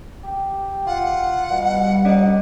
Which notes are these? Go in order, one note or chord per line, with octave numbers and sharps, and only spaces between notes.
G4
F4 F#5
B2 G3
D#2 C#4 D5 D#5